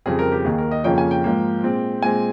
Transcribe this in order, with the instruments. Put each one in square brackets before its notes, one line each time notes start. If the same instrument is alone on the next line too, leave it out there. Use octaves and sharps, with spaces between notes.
[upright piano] F2 C#3 G3 C4 G#4
A#4
G4
D#2 D#3 A#3 G#4
A#4
D#5
F2 C#3 F3 A#3 C#4 G5
G#5
G5
G#2 F3 A#3
A#2 G#3 C4
A#2 G#3 C4 G#5